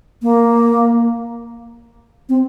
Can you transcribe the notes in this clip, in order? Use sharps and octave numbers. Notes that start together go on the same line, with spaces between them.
A#3
C4